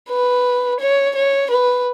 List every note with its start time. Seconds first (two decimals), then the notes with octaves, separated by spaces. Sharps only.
0.11 B4
0.80 C#5
1.15 C#5
1.50 B4